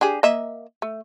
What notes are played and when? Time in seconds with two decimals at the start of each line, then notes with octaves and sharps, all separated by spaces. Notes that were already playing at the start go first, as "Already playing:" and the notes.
0.01 D4 G4 G#4
0.23 A#3 D#5 E5
0.82 A3